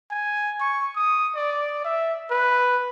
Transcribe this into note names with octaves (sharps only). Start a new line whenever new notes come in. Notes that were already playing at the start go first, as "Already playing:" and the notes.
G#5
C#6
D#6
D5
E5
B4